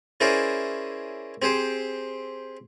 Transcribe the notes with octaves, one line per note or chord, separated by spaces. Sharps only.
C#4 E4 G#4 A#4 C5 D5
C4 G4 G#4 C5